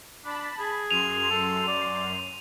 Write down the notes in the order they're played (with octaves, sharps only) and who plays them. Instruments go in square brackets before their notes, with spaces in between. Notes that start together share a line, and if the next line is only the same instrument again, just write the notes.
[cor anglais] D4 [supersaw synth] A5 B5
[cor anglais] G#4
[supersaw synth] F#2 C6 [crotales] D#7 F7
[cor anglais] A4
D5